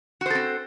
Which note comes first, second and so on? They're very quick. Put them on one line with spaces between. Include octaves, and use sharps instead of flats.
F#4 C5 A4 C4